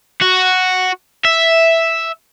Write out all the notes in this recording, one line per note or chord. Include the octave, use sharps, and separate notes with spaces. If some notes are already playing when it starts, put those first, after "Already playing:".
F#4
E5